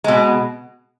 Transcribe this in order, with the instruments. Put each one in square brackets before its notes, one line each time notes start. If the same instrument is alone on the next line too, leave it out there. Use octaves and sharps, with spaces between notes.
[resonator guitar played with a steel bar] B2 G#3